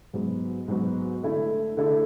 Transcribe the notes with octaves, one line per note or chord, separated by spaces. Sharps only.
G#2 F#3 B3 F#4
G#2 F#3 B3 F#4
D3 A3 E4 A4
D3 A3 E4 A4